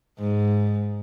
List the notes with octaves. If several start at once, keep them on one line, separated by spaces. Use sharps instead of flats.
G#2